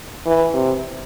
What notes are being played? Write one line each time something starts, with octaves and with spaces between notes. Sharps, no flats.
E3
C3